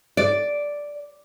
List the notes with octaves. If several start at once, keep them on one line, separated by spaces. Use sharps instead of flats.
D5